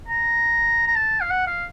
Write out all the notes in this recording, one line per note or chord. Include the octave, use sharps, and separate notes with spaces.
A#5
A#5
A5
F5
F#5
F5